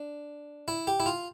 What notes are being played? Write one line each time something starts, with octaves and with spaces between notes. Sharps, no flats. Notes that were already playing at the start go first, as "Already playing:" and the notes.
Already playing: D4
E4
G4
E4
F4